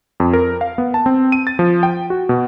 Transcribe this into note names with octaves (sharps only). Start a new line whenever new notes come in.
F2
A#4
F5
B3
A5
C4
D#7
A6
F3
G5
F#4
B2